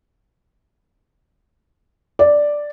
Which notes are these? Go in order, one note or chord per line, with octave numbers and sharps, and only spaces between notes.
D5